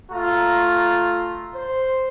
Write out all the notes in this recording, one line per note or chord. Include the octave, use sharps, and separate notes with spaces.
A3 F4 A#5
C5